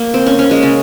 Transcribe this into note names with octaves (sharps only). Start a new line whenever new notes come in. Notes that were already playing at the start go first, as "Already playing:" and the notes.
Already playing: A#3
C4
C#4
C#4
G#3
C#3